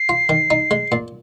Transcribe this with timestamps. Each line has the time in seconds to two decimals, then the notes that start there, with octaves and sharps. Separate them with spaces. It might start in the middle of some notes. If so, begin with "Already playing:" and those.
Already playing: C7
0.09 F4
0.29 D#3
0.51 D#4
0.71 G#3
0.92 A#2